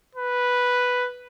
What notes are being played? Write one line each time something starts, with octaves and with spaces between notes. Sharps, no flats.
B4